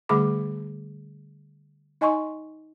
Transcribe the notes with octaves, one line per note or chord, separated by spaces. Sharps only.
D3 G3 A3 G#4 B5 D6
D#4 D#5 G#5 C6 C#6